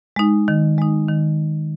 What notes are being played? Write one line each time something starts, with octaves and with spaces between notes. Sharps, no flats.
G#3 D#4
D#3
G#3 D#4
D#3